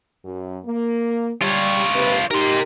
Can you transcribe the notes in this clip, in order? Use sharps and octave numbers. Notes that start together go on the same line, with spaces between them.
F#2
A#3
G3 F4 C#5
D#2 C3 B4
D#4 G4 A#4 C6